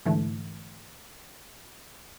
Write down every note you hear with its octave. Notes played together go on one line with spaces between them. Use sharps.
G#2 D3 E3 A3